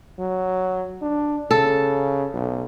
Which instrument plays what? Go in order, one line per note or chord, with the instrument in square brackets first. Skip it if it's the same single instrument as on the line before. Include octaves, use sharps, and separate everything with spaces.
[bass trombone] F#3
D4
[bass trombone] C#3 [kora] A4
[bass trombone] B1